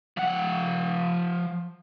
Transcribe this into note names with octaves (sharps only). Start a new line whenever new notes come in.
F3 F#5